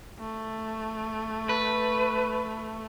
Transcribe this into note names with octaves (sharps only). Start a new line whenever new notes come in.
A3
B4